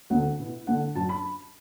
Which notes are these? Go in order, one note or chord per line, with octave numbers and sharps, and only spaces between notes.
D2 D3 A3 F#5
B2 B3 E4
D3 A3 D4 F#5
F#2 F#3 D4 A5
B5